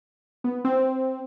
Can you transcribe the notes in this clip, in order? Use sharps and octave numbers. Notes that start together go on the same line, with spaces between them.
B3
C4